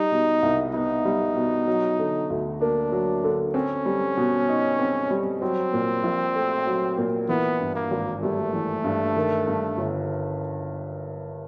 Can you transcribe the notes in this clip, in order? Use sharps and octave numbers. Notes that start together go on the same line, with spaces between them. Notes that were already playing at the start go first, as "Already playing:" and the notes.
Already playing: G3 D#4
B2
C2
B3 D#4
G3
B2
F#3
D3
D2
A#3 D4
F#3
D3
C4 C#4
G3
B2
D#4
C4
G3
F#3 C4
A#2
A#1
A3
F#3
A#2
E3 B3
G2
A#3
G#1
G3 A3
E3
G2
D#3
G2
G1